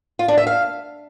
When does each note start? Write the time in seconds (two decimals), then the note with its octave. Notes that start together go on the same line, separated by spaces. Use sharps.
0.19 F4
0.28 D4
0.38 E5
0.47 F5